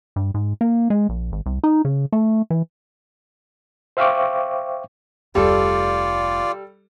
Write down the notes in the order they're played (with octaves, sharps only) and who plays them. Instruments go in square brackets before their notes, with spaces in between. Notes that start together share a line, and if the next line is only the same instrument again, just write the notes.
[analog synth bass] G2
G#2
A#3
G#3
A#1
G#1
C2
D#4
C#3
A3
E3
[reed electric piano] C5 E5 F5 G5 C#6 D6
[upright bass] F1 D2 [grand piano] G3 A4 [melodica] F4 D5